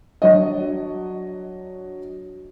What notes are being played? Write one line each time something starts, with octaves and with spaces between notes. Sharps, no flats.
F#3 D4 C#5 D#5